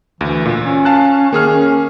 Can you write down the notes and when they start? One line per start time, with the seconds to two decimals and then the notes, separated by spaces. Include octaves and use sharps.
0.21 D2 E3
0.45 A#2
0.64 C#4
0.85 F5 A5 F#6
1.33 D#3 A#3 G#4 F6
1.53 C#4